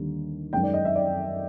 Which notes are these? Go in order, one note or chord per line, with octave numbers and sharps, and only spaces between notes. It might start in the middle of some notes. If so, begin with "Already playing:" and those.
Already playing: D#2 D3 G3
F#2 D#3 G#3 G5
D5
D#5
E5
D5